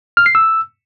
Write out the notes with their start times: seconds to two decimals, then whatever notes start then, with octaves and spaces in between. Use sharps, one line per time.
0.17 F6
0.26 C7
0.35 E6